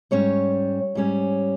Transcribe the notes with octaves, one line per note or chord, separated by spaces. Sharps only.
G#2 G3 C#4 C#5
G#2 G3 C#4